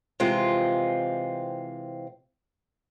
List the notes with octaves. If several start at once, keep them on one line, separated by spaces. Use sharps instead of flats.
C3 E3 G#3 C4 F4